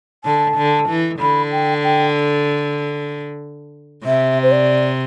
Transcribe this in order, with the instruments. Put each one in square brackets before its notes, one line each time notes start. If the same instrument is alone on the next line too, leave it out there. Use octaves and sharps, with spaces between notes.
[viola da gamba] D3 [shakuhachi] A5
[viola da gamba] D3
E3
[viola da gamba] D3 [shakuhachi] B5
[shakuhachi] G5
G5
[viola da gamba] C3 [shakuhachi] E5
[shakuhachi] C5
D5